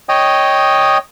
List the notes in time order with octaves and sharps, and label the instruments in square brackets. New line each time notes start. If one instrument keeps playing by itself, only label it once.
[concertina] C#5 D#5 G5 D#6